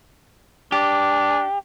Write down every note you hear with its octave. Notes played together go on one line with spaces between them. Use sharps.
D4 G4